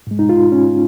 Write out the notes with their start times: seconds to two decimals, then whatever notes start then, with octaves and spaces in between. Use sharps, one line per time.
0.07 G#2 G#3
0.19 D#4
0.29 F4
0.52 C#4